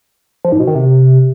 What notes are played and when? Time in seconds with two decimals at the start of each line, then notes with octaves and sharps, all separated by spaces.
0.45 F3
0.52 G#2
0.60 B2
0.67 D#3
0.75 C3